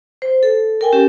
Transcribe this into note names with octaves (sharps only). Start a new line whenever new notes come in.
C5
A4
A#4 G5 G#5
C#4 G4